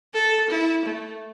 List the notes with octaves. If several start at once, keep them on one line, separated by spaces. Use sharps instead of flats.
A4
E4
A3